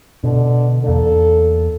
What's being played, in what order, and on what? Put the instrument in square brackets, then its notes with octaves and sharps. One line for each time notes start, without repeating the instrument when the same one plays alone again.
[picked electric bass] B2 [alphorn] D3
[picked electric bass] E2 A#3 D4 [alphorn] A4